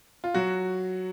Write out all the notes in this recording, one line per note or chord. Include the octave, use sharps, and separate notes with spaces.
F4
F#3 F#4